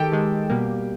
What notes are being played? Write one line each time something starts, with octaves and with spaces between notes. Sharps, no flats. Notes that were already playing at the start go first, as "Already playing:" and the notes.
Already playing: D#3 G#3 G4 A4 G5 A5
D#3 G#3
B2 G3 A#3